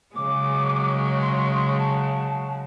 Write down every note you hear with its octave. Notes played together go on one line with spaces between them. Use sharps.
C#3 F#3 G#3 D6
C6
A5